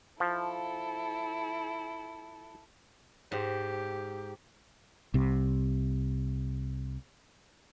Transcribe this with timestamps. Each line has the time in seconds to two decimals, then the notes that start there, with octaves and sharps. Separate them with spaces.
0.20 F3 E4 A4
3.32 G#2 G4
5.14 C2 C3